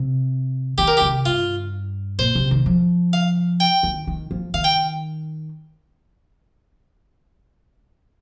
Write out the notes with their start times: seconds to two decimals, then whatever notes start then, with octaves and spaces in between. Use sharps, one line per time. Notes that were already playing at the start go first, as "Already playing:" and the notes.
Already playing: C3
0.78 D#3 G4
0.88 A#4
0.97 G4
1.01 C3
1.26 G2 F4
2.19 A#2 C5
2.35 C3
2.51 D#3
2.66 F3
3.13 F5
3.60 G5
3.83 D#3
4.07 D#3
4.31 F3
4.54 D#3 F5
4.64 G5